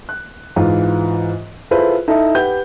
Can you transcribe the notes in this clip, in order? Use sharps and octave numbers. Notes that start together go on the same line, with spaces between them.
F#6
G#2 E3 F4
E4 F4 G#4 A4 B4 C5
D#4 E4 A4 E5
G4 B4 F#5 G6